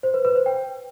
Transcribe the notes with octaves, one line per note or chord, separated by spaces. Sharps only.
C5
B4
B4
C5
G5